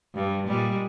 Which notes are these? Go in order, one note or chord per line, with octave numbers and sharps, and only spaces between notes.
G2
A#2 G3 G#3